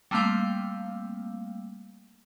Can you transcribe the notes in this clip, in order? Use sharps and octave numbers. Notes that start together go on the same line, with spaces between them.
G3 A3 A#3 C4 F5 G5